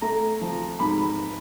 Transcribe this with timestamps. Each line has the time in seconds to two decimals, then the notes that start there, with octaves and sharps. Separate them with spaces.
0.02 A3 A#5
0.41 F3
0.79 G#2 B5